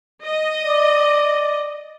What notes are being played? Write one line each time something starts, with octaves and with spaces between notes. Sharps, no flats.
D#5
D5